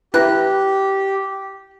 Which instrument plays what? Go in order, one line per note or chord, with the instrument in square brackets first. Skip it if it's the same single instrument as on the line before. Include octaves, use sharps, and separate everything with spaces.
[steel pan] E4 B4 A#5 [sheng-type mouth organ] G4 [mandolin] F#6